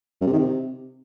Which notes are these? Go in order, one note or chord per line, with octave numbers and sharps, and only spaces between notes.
F#2
C3
D#3
C3